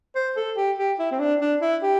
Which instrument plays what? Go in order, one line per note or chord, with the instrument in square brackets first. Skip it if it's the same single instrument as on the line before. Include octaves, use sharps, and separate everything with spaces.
[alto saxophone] C5
A4
G4
G4
E4
C4
D4
D4
E4
G4